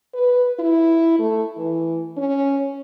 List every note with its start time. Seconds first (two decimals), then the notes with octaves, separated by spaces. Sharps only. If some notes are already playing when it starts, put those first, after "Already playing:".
0.14 B4
0.59 E4
1.19 A3
1.57 E3
2.17 C#4